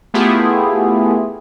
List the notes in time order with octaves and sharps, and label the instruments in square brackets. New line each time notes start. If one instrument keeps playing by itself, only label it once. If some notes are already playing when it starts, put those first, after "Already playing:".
[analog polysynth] A3 B3 E4 F4 G4 G#4